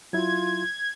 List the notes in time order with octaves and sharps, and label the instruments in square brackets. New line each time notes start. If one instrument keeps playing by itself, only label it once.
[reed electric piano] F#3 E4 [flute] F4 [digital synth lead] G#6